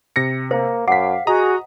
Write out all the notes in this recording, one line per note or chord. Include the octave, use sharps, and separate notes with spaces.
C3 A#6 C#7
A#3 C5
F#2 F5 F#5 D6 B6
F#4 G#4 D#5 A#5 D#6